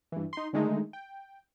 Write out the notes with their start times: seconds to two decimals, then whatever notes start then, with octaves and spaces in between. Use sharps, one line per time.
0.12 G2 E3
0.33 D#4 C6
0.53 D3 D#3 G#3 A3 D#4
0.93 G5